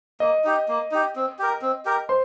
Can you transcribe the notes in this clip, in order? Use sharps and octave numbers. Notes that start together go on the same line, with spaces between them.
A#3 D#5
D#4 G4
A#3
D#4 G4
C4
G4 A#4
C4
G4 A#4
C5 C6